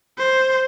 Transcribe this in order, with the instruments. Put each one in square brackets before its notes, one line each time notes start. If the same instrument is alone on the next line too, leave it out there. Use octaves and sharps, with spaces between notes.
[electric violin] C5